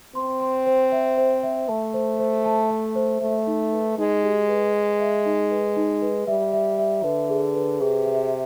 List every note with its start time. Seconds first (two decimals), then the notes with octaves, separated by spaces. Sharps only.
0.15 C4 C6
0.41 C6
0.66 C5
0.92 E5
1.17 C5
1.43 E5
1.69 A3 A5
1.94 C5
2.19 C5
2.45 A5
2.70 E5
2.95 C5
3.21 A3 E5
3.47 D#4
3.73 B4
3.98 G#3 D#4
4.23 G4
4.49 B4
4.74 B4
5.00 E5
5.26 D#4
5.51 B4
5.77 D#4
6.02 B4
6.27 G3 E5
6.53 E5
6.78 E5
7.04 D3 B4
7.29 G#4
7.55 B4
7.80 C3 G#4
8.06 E5